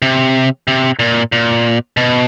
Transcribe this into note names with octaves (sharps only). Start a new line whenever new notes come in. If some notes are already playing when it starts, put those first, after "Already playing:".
C3
C3
A#2
A#2
B2